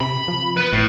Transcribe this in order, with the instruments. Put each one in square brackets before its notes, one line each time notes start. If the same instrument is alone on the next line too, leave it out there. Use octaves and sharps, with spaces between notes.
[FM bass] C3 [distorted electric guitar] B5
[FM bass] F3
[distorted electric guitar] B3 B4
[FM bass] G#1 [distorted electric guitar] A2